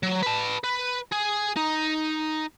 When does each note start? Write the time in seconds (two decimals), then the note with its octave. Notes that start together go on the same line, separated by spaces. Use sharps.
0.03 F#3
0.23 B4 A5
0.64 B4
1.12 G#4
1.56 D#4